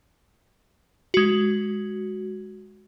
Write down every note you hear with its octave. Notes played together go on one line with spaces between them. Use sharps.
G#3 F#4